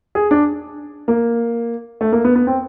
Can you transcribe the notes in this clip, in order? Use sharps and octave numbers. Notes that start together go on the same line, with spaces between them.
G#4
D4
A#3
A3
A#3
B3
B3
C4